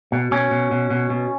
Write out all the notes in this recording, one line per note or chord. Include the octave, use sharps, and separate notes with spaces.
B2
B2 C#4
B2
B2
B2
B2